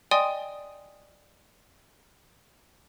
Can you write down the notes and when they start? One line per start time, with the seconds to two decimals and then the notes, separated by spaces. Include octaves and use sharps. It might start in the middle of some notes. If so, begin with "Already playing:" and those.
0.11 D5 D#5 G5 G#5 C6 D#6